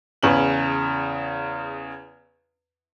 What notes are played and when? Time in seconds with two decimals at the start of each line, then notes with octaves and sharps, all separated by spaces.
0.23 E2 C#3 F#7